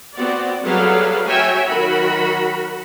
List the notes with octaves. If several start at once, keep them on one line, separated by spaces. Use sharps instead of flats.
B3 C4 F#4 D5
F#3 G3 G#4 A4 B4 F5
F#4 C#5 E5 G5 G#5
D#3 F#3 F#4 A#4 B5